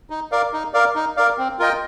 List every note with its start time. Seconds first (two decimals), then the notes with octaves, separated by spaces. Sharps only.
0.10 D#4
0.32 A#4 D5 F5
0.53 D#4
0.74 A#4 D5 F5
0.95 D#4
1.17 A#4 D5 F5
1.38 C4
1.59 F4 A#4 D#5 G5